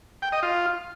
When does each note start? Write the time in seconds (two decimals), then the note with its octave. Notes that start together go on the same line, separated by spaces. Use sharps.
0.22 G5
0.32 D#5
0.43 F4